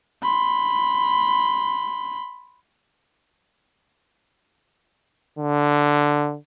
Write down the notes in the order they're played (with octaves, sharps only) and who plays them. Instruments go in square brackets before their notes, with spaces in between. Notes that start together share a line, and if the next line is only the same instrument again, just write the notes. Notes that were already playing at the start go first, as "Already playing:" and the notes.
[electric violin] B5 C6
[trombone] D3